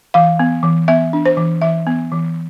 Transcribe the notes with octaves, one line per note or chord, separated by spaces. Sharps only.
E3 F5
B3
E3
B3 E5
D4
C5
E3
E3 E5
B3
E3